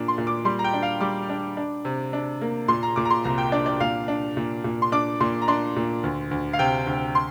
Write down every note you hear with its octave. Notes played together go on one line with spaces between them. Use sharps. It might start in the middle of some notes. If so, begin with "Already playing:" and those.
Already playing: A#2 D4
C6
A#2
D6
G3 C6
A#5
G5
D4
F5
G3 D6
D4
D4
C3
D4
A#3
A#2 C6
A#5
A#2 D6
A#5
C6
C2 A#5
G5
D4 D5
D5
A#2 F5
D4
A#2
A#2
C6
D4 D6
A#2 C6
A#5
D4 C6
A#2
D2
D2
F5
C3 G5
D2
C6